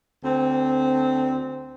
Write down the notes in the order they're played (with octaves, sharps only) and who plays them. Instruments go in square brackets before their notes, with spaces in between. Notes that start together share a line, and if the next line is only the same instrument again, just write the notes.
[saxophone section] D2 C4